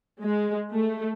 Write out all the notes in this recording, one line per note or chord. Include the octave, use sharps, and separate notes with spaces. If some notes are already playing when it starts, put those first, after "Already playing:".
G#3
A3